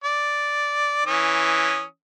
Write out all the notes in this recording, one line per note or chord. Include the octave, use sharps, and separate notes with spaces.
D5
E3 C#4 D#6